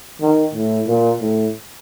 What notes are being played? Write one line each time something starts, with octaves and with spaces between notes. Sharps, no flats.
D#3
A2
A#2
A2